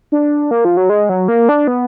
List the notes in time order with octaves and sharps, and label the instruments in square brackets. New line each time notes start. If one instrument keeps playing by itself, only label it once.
[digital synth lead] D4
A#3
F3
F#3
G#3
F#3
A#3
D4
B3